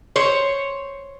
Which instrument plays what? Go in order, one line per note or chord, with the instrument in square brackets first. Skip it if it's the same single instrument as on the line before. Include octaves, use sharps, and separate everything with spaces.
[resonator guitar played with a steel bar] C5 C#5